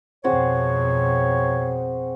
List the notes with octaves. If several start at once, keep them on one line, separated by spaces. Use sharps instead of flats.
F2 B2 C4 F#4 G#4 C#5